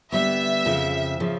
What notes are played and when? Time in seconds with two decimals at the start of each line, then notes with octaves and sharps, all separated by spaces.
0.12 D3 G3 B3 E5
0.66 F2 C#3 F3
1.20 C#3 F3